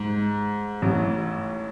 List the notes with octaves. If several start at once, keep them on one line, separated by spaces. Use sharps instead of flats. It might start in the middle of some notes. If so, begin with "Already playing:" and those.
Already playing: G#2
A1 A2